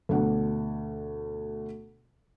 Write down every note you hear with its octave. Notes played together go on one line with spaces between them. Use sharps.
D2 B2 D4 F#5